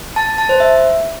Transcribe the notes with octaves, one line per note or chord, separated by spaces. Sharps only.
A5
A5
A5
C5
E5